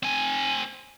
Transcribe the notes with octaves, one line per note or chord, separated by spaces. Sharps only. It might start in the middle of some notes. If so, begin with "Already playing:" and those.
C4 G#5